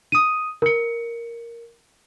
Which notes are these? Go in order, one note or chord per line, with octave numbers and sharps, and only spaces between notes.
D#6 D#7
A#4 C#7